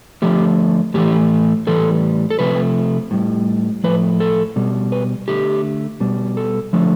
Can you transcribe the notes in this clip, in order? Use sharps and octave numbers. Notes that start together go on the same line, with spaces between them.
D3 F3 A3 G4
A2 E3 A3 G4
A2 E3 G3 A4
A4
C3 F3 A3 B4
A2 G3
A2 F3 A3 B4
A4
B2 G3
B4
D3 A3 G4
B2 G3
A4
D3 F3 A3